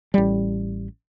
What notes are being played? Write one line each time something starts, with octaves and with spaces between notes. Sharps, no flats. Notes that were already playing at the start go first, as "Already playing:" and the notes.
A1 G3